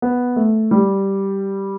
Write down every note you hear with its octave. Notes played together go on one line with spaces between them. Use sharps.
B3
A3
G3